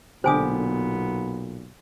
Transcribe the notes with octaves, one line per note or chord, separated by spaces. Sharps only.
B1 A#2 D3 B3 G4 C5 G#5 D#6